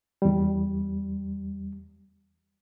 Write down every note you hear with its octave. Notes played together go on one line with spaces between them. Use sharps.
E2 G3